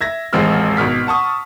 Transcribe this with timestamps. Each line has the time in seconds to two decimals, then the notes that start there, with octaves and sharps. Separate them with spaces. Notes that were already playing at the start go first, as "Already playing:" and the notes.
0.01 E5 G#6 A#6
0.33 D#1 A1 G#3 C4 E6 F6
0.77 G#1 B2 F6 B6
1.07 F#5 A5 C#6 D#6